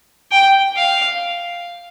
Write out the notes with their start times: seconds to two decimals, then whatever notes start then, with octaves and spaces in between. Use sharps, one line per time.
0.31 G5
0.76 F5